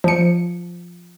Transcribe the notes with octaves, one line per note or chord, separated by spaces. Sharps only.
F3 C#7